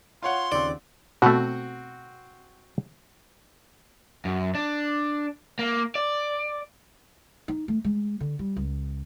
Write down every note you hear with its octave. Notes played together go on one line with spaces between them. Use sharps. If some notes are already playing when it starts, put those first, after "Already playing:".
F4 C#5 F#5 C6
D#2 C#3 C4 D5
B2 A3 C4 F#4 F#5
F#2
D4
A#3
D5
D#4
A3
G#3
D3
G3
C#2